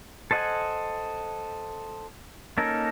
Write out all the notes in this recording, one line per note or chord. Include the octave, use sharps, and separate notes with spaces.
A4 C5 D#5 F#5 G#5
A#3 C#4 D#4 A4 A#4